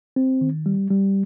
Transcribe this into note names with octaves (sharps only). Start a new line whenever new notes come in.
C4
D#3
G3
G3